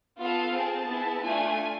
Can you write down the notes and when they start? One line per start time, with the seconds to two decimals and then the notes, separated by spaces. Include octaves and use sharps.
0.20 B3 F4 A4 F5
0.54 C4 G#4 A5
0.89 B3 E4 G#4
1.23 A3 D4 F4 G#5